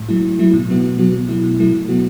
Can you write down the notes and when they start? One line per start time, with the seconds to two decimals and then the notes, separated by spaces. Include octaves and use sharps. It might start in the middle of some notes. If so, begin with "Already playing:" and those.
Already playing: A2
0.09 F#3 A3 E4
0.24 A2
0.39 F#3 A3 E4
0.54 B2
0.69 F#3 B3 F#4
0.84 B2
0.98 F#3 B3 F#4
1.14 B2
1.29 F#3 A3 E4
1.44 B2
1.59 F#3 A3 E4
1.73 B2
1.89 F#3 B3 F#4